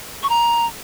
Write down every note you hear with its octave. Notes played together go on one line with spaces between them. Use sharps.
C#6
A#5